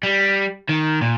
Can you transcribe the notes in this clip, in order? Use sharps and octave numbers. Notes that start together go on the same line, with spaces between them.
G3
D#3
A#2